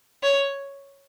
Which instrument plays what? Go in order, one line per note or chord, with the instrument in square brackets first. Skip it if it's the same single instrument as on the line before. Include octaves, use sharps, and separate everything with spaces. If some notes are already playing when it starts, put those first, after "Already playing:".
[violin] C#5